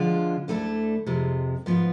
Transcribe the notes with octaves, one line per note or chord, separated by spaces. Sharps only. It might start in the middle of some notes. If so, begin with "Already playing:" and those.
Already playing: D3 F3 G#3 D4 F4
D2 D3 A3 E4 A4
F2 C3 F3 G#3
G#2 F3 B3 F4